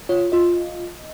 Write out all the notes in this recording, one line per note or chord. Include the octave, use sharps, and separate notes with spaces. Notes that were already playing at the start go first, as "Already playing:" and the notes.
F4 C#5
F4 D#5